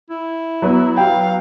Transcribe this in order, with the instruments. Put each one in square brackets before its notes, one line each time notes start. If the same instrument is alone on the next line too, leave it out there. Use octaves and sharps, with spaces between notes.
[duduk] E4
[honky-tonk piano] F#3 B3
[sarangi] F5 [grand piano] G5